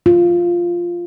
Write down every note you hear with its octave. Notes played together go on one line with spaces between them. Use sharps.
F4